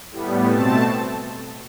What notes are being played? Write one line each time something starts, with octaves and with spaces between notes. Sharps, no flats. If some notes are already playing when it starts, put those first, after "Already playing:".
A2 G3 B3
B2 A3 C4 A5